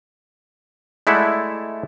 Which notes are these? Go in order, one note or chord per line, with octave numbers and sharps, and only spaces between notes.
G#3 A3 E4 D5 E5 F#5